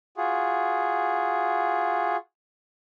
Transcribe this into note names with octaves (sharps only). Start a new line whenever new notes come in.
F4 F#4 G#4